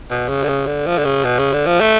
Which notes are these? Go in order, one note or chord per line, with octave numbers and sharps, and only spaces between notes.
B2
C#3
D3
C#3
D3
F3
D3
C#3
B2
C#3
D3
F3
A3